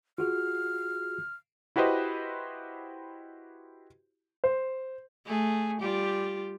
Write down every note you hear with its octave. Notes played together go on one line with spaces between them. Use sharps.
F4 F#4 G#4 F6
E4 F#4 G4 B4 C5 D#5
C5
A3 G#4
G3 F4 G4